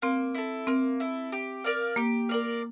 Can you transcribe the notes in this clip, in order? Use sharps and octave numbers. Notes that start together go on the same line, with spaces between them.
A#3 C4
E4 A4
A#3 C4
E4 A4
G4
A#4 D5 F5
A#3 G4
A#4 D5 F5